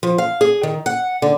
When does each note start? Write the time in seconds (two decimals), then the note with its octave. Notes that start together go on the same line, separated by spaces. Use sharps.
0.03 F3
0.18 F5
0.41 G#4
0.63 D#3
0.86 F#5
1.22 D3